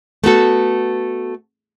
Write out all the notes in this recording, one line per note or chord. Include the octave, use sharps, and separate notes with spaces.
A3 B3 F#4 A4